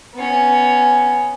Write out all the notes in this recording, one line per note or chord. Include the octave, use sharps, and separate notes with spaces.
B3 C#4